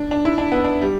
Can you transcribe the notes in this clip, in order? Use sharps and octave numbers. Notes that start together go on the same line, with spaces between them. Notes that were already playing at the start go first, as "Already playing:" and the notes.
Already playing: D4
D4
E4
D4
B3
D4
G3